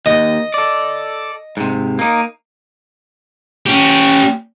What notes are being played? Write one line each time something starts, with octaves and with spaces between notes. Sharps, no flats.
D#2 D#5
A4 D5
G#2 C3
A#3 D#4
C#4 G4